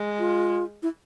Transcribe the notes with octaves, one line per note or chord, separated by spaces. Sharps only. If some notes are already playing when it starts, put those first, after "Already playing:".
Already playing: G#3
F4
E4